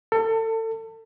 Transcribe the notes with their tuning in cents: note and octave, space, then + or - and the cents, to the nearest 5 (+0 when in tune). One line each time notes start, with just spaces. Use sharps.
A4 +30